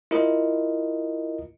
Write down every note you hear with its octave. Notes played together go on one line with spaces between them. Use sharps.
E4 F4 A#4 D#5